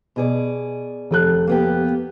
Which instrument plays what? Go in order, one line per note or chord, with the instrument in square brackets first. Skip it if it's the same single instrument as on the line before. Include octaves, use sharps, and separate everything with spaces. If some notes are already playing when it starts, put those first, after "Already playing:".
[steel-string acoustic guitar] B2 G#4 D5
[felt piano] F1 A4 F#6
[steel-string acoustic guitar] A#3 B3 G4